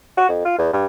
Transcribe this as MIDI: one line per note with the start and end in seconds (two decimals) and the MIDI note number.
0.17 0.28 66
0.29 0.44 41
0.45 0.54 65
0.58 0.68 40
0.73 0.86 43